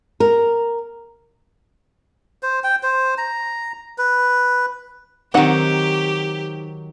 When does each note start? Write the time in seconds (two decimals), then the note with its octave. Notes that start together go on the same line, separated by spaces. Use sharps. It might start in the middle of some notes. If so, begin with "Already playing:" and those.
0.20 A#4
2.43 C5
2.64 G5
2.83 C5
3.18 A#5
3.98 B4
5.34 D#3 F#3 C4 D#4 G4 F#5